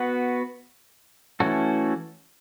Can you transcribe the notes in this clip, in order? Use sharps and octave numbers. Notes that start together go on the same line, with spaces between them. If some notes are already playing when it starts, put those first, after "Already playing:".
Already playing: B3 F#4 B4
E3 A3 C#4 F#4 A4